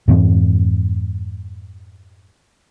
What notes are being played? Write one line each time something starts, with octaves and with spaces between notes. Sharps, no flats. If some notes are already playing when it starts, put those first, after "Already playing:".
F2 G#2 E3 C4